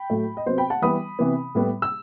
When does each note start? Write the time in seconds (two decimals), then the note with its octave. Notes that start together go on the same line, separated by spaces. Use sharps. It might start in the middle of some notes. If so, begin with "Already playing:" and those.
Already playing: G5 B5
0.10 A2 F#3 A3
0.37 D#5
0.46 C3 F#3 B3 C5
0.58 G5 B5
0.70 F#5 A5
0.82 E3 G3 B3 B5 D#6
1.19 C3 E3 B3
1.55 A2 G3 B3
1.82 E6